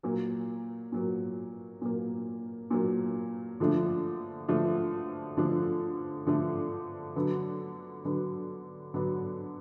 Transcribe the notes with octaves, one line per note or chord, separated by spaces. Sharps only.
A#2 F#3 A#3
A#2 F#3 A#3
A#2 F#3 A#3
A#2 F#3 A#3
D3 F3 A3 D4
D3 F3 A3 D4
D3 F3 A3 D4
D3 F3 A3 D4
D3 F#3 B3 D4
D3 F#3 B3 D4
D3 F#3 B3 D4